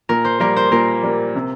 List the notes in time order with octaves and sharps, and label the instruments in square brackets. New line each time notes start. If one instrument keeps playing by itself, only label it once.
[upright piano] A#2 [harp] A#4
[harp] C5
[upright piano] G3 A#3 [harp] A#4
[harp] C5
[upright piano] A#2 [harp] A#4
[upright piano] G3 A#3
C3